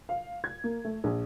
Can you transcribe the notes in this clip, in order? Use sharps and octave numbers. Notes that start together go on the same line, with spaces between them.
F5
G#6
A#3
A3
A#1